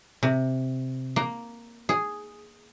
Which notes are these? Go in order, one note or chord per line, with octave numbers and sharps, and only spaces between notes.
C3
A#3
G#4